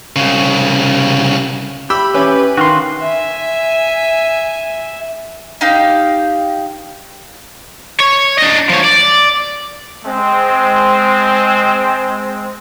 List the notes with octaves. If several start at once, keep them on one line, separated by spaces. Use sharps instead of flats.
C2 C#3
G4 B5 E6
E3 C#4 B4
D#3 F#4 F5 C6
E5 G#5
D#4 G4 F5 G5
C#5
D4 D#5
F3 C#5
D5
G#3 C4